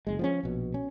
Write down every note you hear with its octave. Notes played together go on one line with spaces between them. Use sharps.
F#1 G#3
F3 B3 C#4
A#1 B2
C#4